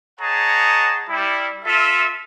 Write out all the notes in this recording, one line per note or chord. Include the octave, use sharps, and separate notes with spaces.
G#4 C#5 D#5 F#5 A5 A#5
G3 E4
F4 A4 E5